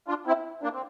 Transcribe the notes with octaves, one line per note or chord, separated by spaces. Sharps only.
D4 F4
C4 E4
A#3 D4
C4